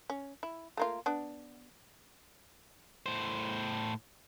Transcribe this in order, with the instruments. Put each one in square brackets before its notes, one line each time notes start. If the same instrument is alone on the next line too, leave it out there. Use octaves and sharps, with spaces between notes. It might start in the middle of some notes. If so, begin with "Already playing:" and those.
[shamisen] C#4
E4
A3 A#3 F4
B3 D4
[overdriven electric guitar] A2 C5